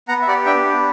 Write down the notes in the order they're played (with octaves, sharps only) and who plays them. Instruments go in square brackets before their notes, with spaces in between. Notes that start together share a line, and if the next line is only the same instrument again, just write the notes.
[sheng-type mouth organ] B3 F#5 A#5
E5
G4 D5 F#5
D4 E5 G5
B3